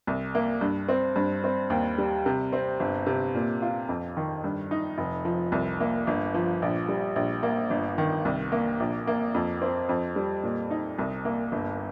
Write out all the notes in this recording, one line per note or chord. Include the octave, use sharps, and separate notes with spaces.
C2
A#3
G2
C4
G2
C4
D#2
G3
C3
C4
G1
C3
A#2
F4
F2
D#3
G2
D#4
F1
F3
C2
A#3
G1
F3
A#1
G3
A#1
A#3
G1
D#3
C2
A#3
A#1
A#3
F2
C4
F2
G3
A#2
D#4
C2
A#3
G1